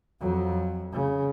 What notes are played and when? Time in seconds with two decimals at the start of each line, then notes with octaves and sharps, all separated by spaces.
0.20 F2 F#3
0.92 C#3